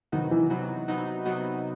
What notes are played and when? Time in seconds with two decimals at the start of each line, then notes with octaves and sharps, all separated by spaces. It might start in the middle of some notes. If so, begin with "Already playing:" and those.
0.12 C3 D#3 F#3 B3 D#4 F#4
0.31 E3
0.50 C3 F#3 B3 D#4 F#4
0.88 C3 F#3 B3 D#4 F#4
1.25 C3 F#3 B3 D#4 F#4